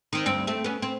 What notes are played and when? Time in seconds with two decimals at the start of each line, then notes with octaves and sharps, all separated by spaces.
0.13 D#3 C4
0.26 D2 G2 C4
0.47 A3 C4
0.64 B3 C#4
0.82 C4